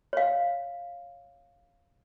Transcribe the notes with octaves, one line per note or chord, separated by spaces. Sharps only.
C#5 F5